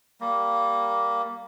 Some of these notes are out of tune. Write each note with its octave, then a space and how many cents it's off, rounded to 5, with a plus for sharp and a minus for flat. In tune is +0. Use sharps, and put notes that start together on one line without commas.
G3 +0 A#3 +0